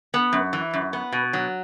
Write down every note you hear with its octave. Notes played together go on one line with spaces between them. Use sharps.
B3
F#2
E3
F#2
B3
B2
F#3